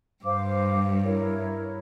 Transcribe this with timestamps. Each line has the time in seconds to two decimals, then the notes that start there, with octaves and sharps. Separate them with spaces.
0.25 G2 C5 F5 D6
1.04 E4 A#4 C#5